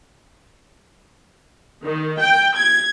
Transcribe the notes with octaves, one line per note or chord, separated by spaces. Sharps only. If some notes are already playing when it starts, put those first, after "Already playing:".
D#3
G5
G#6